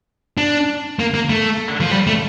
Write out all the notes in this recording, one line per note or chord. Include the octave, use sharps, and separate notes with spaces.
D4
A#3
A#3
A3
F3
G3
A3